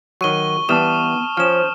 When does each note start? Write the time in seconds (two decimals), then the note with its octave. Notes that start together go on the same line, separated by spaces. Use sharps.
0.21 D#3 F#3 C#6 D#7 G7
0.69 E3 G3 B3 A5 D#6 F6 E7
1.37 F3 C#4 C5 F6 E7